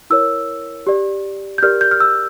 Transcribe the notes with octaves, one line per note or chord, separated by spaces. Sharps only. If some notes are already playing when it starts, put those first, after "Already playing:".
E4 A#4 C#5 E6
G4 D5
G6
G4 A#4 D5 F6
G6
F6
E6